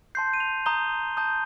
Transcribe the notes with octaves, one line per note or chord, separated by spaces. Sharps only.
A5 C6 G6 C7
D#7
F7
A#5 D#6 G6 G7
A5 D#6 G6